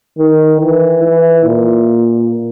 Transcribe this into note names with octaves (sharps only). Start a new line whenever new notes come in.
D#3
E3
E3
A#2